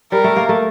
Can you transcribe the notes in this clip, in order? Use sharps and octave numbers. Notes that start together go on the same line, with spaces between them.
G3 A#4
A3
A#3
A3